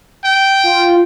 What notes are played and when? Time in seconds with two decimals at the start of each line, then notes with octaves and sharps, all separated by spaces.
0.25 G5
0.64 F4